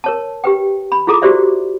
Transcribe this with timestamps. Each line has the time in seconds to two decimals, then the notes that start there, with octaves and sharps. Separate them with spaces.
0.04 A#4 C#5 A5
0.44 G4 B4 G5
0.92 B5
1.07 E4 F4 G#4 A4 A#5 D6
1.22 F#4 G4 C5 D5 E5